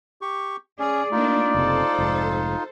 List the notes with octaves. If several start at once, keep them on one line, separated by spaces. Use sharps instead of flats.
G4 C#6
C#4 G#4 D5
A3 A#3 D4 D#4 F4
F#1 C3 A4 C5
F1 G#2